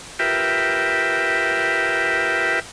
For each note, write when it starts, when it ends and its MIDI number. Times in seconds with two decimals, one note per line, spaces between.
0.19 2.60 65
0.19 2.60 67
0.19 2.60 70
0.19 2.60 71
0.19 2.60 76
0.19 2.60 79